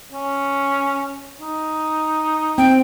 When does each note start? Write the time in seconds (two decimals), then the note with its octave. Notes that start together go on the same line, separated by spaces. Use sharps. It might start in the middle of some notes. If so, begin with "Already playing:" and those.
0.12 C#4
1.40 D#4
2.58 C4 G5